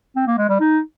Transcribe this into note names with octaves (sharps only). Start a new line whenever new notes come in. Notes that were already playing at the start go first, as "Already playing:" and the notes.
C4
A#3
G#3
G3
D#4